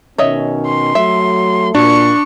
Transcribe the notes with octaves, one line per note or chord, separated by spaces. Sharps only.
B2 D#3 C#4 C#5 D#5 E5
C6
F#3 A3 E5
A#2 D4 F#4 C#6